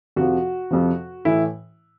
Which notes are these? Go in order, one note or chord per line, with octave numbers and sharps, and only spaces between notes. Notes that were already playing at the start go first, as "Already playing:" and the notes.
F2 C3 F3 F#4
F2 C3 F3
A2 E3 E4